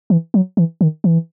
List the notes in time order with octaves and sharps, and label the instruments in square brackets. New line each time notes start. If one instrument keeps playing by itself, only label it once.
[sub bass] E3
F#3
E3
D#3
E3